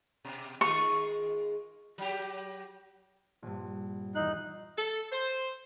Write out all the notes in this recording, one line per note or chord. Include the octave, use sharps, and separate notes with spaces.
B2
D#3 G#3 F4 C#6
F#3 G4
A#1 G2
E2 D#4 E5 F#6 C7
A4
C5